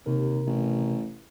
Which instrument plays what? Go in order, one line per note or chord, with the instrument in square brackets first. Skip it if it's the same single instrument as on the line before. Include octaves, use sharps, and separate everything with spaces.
[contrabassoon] D#2 [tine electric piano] C3 A#4
[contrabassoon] A1